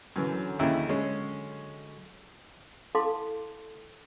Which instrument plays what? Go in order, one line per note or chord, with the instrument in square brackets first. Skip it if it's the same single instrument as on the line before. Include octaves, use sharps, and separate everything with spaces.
[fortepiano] F#2 E3 [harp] D3 F#3
[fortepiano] D#2 C#3 E4
G#3 C#4
[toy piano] E4 A4 F5 A5 C6 D6